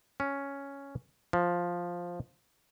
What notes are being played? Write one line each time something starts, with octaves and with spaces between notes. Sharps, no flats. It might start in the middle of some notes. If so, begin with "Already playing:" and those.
C#4
F3